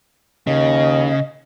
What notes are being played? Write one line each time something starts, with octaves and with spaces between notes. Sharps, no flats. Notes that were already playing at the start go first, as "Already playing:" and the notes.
D#2 C#3 D#5